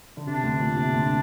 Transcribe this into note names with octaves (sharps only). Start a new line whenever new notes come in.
D3
C3 D4
D2 D3
A#2
C3
D2 D3